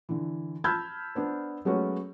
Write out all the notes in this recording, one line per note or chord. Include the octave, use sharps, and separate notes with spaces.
D3 E3
A5 B5 E6 F6 G6 G#6
B3 D4 C5
F#3 G#3 A3 B3 C#4 F#4